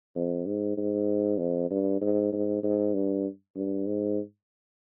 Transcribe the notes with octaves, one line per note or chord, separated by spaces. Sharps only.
F2
G#2
G#2
F2
G2
G#2
G#2
G#2
G2
G2
G#2